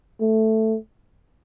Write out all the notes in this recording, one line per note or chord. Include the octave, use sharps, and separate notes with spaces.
A3